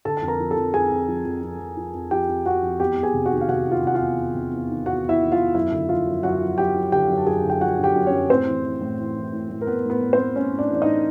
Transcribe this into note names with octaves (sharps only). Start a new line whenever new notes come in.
D3 A4 A5
F2 A5
A#4 A#5
F3
A4 A5
F2
F2 G#4 G#5
F2
F3
F2
F2
F2
F3
F2
F3 G4 G5
F2
F2 F#4 F#5
F2
E2 G4 G5
E2
G#4 G#5
C3
F#4 F#5
D#3
F5
C3 F#4 F#5
D#3
F4 F5
C3 F#5
F4 F5
E2
E2
C3
E2
D#3
E2 F#4 F#5
E2
E4 E5
D#3
F4 F5
E2
F#2 E4 E5
D3
F3 F4 F5
F#2
F#2 F#4 F#5
F3
F#2 G4 G5
F3
D3 G4 G5
F#2
A5
F#2 G#4 G#5
D3
G5
F3 F#4 F#5
D3
G4 G5
F#2
C#4 C#5
F#2
A2 C4 C5
E3
E3
A2
E3
E3
A2
A2
A#4
A2 B3 B4
A2
B3 B4
A2
C4 C5
A2
A2 C#4 C#5
A2
D4 D5
E3 D5
D#4 D#5
A2